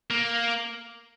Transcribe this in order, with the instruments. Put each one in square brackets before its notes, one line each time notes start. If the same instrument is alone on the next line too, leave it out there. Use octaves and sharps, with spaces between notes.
[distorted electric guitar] A#3